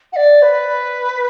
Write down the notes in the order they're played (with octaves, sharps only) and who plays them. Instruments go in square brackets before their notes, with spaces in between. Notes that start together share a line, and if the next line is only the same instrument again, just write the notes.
[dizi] F#5
D5
B4